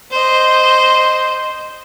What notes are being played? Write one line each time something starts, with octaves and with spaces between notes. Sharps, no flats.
C5 D#5